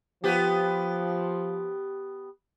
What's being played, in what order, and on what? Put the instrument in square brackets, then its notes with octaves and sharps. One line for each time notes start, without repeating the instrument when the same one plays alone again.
[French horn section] F3 [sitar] B3 G4